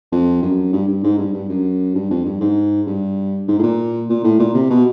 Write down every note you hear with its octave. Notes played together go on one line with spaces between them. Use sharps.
F2
F#2
G2
G2
G#2
G2
G2
F#2
G2
F2
G2
G#2
G2
G#2
A2
A#2
A#2
A2
A#2
C3
B2